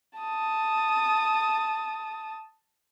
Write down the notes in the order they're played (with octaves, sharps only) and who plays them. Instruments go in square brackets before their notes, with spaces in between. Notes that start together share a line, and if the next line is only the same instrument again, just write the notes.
[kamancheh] A5 D#6